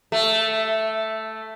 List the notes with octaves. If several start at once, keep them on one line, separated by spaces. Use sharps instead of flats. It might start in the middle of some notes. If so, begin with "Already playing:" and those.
A3